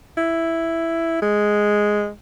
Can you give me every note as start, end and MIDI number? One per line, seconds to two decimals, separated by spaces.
0.17 1.17 64
1.22 2.09 56